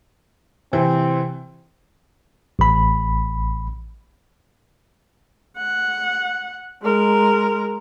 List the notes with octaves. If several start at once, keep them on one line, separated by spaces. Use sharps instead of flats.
C3 E3 C4
A1 B5
F#5
G#3 A#4